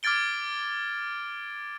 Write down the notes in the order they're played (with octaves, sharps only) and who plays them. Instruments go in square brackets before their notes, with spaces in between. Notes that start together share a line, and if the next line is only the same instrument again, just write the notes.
[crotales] D6 F6 G#6 A6 D7 G7